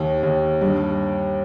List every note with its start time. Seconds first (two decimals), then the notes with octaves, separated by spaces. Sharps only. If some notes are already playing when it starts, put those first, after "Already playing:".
Already playing: D#2
0.23 D#2
0.61 G2